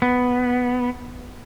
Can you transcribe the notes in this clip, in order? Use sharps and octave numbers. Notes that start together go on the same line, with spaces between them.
B3